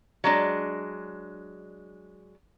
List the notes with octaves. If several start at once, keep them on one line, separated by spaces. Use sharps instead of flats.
F#3 G#3 D4